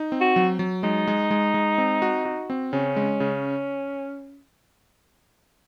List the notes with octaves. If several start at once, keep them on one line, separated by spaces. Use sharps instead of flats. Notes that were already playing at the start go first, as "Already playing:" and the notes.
Already playing: D#4
C4
F#4
F#3
F#3
G#3 D#4
G#3
G#3
G#3
C4
F#4
F#4
C4
C#3 C#4
G#3
C#3